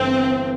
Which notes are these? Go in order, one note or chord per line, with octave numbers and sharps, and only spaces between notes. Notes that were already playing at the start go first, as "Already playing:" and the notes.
Already playing: G1 G2 E3 A3 C4 E4